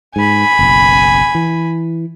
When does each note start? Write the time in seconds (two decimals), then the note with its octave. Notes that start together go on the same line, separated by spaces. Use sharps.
0.16 G#2 G#5 B5
0.59 F#1 B1
1.35 E3